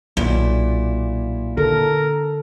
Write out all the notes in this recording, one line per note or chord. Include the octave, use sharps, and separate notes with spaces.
B1 A#2 E4
D3 A4 A#4